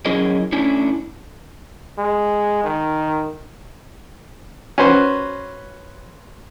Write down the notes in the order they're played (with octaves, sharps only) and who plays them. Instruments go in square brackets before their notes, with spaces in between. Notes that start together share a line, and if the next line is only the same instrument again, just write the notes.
[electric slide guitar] F#3 C#4 E4 G#4 A#4 D#5
A3 C#4 D4 E4
[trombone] G#3
D#3
[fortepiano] C#4 F#4 B4 C5